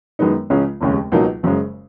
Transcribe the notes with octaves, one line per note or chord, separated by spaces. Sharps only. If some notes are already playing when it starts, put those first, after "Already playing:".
F#2 D#3 G#3 B3 D#4
C#2 C#3 G#3 C#4
F1 D#2 C#3 G#3 C#4
C#2 B2 F#3 A#3 D#4
F#1 F#2 C#3 G#3